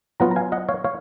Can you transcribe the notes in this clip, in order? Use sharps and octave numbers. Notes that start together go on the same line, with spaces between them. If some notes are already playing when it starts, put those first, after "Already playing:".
F#3 B3 F4 F#5 A#5
A#5
F5 G#5
D#5 F#5
C#5 F5
C#5 F5